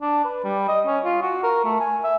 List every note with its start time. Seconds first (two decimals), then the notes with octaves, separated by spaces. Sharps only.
0.02 D4
0.25 B4
0.44 G3
0.68 D#5
0.86 C#4
1.05 F4
1.22 F#4
1.43 A#4
1.64 A3
1.80 G#5
2.04 E5